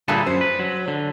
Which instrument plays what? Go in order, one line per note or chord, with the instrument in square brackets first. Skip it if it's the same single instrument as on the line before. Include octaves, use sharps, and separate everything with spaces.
[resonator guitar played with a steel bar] G2 A#2 G3 [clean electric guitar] D3 G#4 A4
[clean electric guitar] F#2 [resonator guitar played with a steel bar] C5
[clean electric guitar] B4
F#3
D3